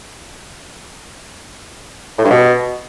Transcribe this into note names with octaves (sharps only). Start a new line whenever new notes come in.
A2
G2
B2